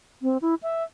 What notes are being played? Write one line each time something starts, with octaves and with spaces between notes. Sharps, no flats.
C4
E4
E5